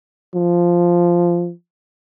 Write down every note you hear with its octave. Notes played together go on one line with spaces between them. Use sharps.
F3